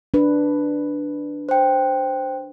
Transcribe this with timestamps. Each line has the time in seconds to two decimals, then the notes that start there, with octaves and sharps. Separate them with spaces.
0.14 D4 B4
1.49 C5 G5